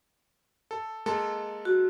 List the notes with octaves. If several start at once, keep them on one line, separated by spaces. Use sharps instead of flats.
A4
G#3 A#3 A4
F#4